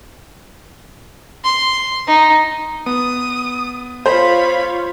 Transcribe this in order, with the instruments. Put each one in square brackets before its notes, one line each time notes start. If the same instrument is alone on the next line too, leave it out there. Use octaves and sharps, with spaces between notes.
[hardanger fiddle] C6
D#4
[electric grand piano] B3 [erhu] D#6
[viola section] F4 C#5 F5 [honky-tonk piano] C5 [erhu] B5